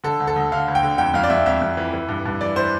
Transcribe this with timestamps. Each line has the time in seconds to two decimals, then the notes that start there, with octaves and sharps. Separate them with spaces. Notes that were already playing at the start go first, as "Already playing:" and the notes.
0.04 D3 A4
0.20 D2
0.27 A4
0.36 D2
0.52 D3 F5
0.68 D2
0.75 G5
0.83 D3
0.98 F2 G5
1.14 F2 F5
1.24 D5
1.30 F2 E5
1.46 F2 E5
1.62 F2
1.77 E3
1.93 E3
2.09 G2
2.25 G2
2.41 E3 D5
2.56 E3 C5